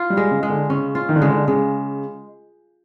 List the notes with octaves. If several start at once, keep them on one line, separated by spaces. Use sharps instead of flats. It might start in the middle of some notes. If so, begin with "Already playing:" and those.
Already playing: F4
G3
G#3
C#3
G#3
D3
C#3 C#4
F4
D#3
D3
C#3 G#3
D3
C#3 G#3